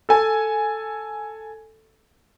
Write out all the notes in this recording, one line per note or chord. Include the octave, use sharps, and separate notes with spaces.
A4 G#5